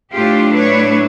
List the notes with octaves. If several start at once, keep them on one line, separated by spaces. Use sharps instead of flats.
A2 F#3 A3 D4 F4 G4
B4 C#5